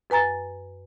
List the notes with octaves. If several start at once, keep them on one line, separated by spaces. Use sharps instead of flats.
F#2 B4 G#5 A#5 A6